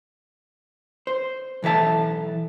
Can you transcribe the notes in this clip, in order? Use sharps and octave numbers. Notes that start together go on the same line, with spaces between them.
C5
B1 E3 A4 E5 A5